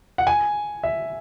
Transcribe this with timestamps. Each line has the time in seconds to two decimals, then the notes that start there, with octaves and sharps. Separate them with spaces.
0.18 F#5
0.27 G#5
0.83 E5